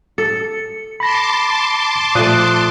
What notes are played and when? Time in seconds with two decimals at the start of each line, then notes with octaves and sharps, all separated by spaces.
0.18 A4 C#7
1.00 A5 B5 C6 D6 A#6
2.15 A#2 F3 A3 D#6 F#6